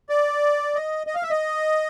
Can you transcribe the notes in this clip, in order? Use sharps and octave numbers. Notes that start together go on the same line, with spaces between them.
D5
D#5
D#5
F5
E5
D#5